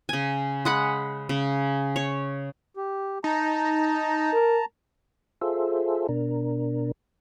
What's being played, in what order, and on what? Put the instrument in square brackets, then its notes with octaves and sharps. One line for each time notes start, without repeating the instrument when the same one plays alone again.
[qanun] C#3 G#5
G#3 F#5 B5
C#3
C#5
[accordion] G4
[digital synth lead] D#4 [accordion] A5 A#5
[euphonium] A#4
[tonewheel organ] F4 G#4 A4 C5 E5
B2 D4 A#4